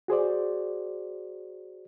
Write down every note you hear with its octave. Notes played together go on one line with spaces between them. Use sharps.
F#4 G#4 C5 D5